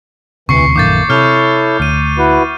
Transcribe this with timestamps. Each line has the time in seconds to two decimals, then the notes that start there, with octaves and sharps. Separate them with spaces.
0.49 E1 D2 C3 E3 C#6 C7 C#7
0.76 A#1 F#2 D#3 A3 A#3 D6 G6 A6
1.10 C3 E4 A4 C#5 F6 G6 F7
1.80 D2 F6 D#7
2.18 E4 F#4 B4